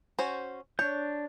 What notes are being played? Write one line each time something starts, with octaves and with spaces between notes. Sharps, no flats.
C#4 F#4 C5
D4 C#5 G6